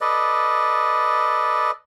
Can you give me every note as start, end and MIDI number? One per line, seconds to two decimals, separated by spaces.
0.01 1.71 69
0.01 1.71 71
0.01 1.71 74
0.01 1.71 75